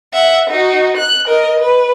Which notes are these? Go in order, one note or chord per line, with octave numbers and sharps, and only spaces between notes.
E5 F#5
D#4 F#4
F#6
A#4 D#5
B4